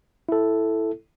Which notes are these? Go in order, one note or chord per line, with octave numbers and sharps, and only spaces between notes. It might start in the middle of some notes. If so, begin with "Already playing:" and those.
E4 A4